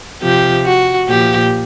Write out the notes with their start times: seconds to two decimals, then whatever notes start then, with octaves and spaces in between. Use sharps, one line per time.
0.23 C3 F3 G4
0.66 F#4
1.08 A#2 F3 G4